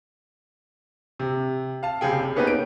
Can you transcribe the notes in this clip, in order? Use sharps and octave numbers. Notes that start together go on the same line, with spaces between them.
C3
F5 A5
F#1 C3 G#4 G5
A#3 B3 C#4 D#4 G4 B4
D7